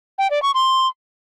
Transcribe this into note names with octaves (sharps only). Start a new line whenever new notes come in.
G5
D5
C#6
C6